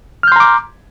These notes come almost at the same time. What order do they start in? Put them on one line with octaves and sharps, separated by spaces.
F6 G6 C6 A#5 D6